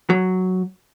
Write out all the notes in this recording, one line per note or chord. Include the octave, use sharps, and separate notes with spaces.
F#3